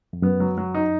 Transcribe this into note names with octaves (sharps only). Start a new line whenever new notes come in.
F2
F#2 B3
F#3
F#3
D#4